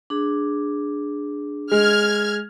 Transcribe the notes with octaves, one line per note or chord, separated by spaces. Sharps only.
D4 G#4
G#3 F6 G#6